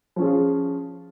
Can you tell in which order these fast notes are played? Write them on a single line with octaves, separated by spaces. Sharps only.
F3 C#4 G#4 F4